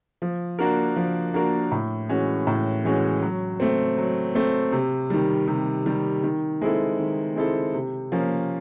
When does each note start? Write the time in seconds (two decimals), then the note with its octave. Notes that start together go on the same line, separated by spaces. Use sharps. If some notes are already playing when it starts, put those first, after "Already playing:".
0.22 F3
0.59 A#3 D4 F#4 A#4
0.96 F3
1.34 A#3 D4 F#4 A#4
1.72 A2
2.09 E3 G#3 C#4 F#4
2.47 A2
2.85 E3 G#3 C#4 F#4
3.22 F#3
3.60 A3 C4
3.98 F#3
4.35 A3 C4
4.72 C3
5.10 D#3 G3
5.48 C3
5.86 D#3 G3
6.23 D#3
6.62 G#3 C4 E4 A4
6.99 D#3
7.36 G#3 C4 E4 A4
7.74 C3
8.12 F3 A#3 C#4